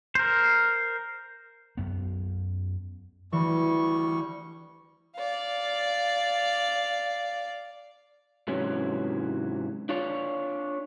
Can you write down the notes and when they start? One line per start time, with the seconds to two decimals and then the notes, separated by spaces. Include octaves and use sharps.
0.15 A#4 C5
1.77 F#2 B3
3.32 D2 E3 G3 C#6
5.16 D5 F5
8.48 G#2 C3 E3 F#3 C#4
9.89 D4 F4 C#5